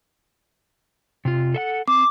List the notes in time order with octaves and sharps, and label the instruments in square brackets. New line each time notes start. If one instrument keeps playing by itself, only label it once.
[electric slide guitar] C3 F4
A4 E5 F#5
[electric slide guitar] C4 [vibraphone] D6